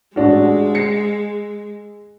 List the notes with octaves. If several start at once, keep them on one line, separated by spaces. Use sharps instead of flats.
A1 G#3 D4 F#4
A#6 C7 C#7